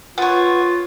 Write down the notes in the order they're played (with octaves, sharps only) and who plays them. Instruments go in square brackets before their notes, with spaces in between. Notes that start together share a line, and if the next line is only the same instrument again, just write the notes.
[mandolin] B3 C#5 [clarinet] F4